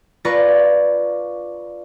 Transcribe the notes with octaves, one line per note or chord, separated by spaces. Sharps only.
D4 F4 B4 D5 A#5 C#6